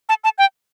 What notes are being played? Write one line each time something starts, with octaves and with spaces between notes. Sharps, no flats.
A5
A5
G5